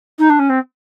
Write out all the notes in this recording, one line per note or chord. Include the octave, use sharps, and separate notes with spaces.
D#4
D4
C#4
C4